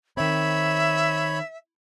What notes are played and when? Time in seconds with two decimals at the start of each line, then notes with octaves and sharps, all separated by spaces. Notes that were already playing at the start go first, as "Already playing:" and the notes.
0.17 D#3 C4 C#5 E5 B5